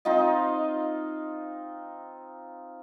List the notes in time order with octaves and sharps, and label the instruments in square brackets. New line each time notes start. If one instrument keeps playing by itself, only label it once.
[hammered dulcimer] C4 D#4 F4 D#5